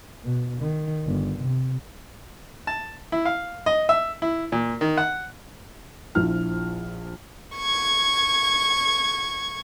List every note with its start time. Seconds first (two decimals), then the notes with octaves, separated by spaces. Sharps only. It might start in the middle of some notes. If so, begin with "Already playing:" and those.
0.23 B2
0.62 D#3
1.06 G1
1.40 C3
2.67 A5
3.12 E4
3.25 F5
3.66 D#5
3.89 E5
4.22 E4
4.52 A#2
4.81 D#3
4.98 F#5
6.15 A#1 F3 E4 F6
7.56 C#6 G#6